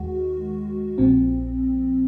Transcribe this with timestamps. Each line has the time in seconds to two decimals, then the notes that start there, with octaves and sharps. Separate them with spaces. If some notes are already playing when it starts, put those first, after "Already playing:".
Already playing: D#2 D#3 G#3 F#4
0.98 A#1 A#2 F3 C4